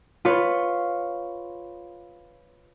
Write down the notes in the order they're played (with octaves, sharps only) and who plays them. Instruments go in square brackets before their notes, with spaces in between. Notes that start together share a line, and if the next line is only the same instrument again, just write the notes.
[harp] F4 B4 C#5